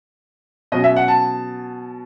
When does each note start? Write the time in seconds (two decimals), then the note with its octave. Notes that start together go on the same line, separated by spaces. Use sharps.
0.72 B2 F#3 C#4 D#5
0.84 E5
0.96 F#5
1.08 A5